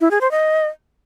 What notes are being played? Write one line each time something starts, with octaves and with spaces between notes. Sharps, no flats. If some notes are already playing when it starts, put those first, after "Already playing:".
E4
G#4
C5
D#5